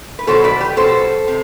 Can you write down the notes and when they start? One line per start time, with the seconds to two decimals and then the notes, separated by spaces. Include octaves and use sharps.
0.19 B4
0.27 B2 F#3 A4 C5
0.44 B4 D5
0.61 G4 B4
0.77 B2 F#3 A4 C5
1.28 C3